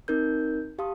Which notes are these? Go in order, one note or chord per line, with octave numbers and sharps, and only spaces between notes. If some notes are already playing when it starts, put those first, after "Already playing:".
C4 D#4 A#4 G6
G4 F5 A5 C6 D#6